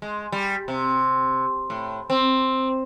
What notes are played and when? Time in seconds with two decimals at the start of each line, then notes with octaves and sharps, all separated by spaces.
0.02 G#3
0.32 G3
0.68 C3
1.70 A2
2.10 C4